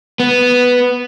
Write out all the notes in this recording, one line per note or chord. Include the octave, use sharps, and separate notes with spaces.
B3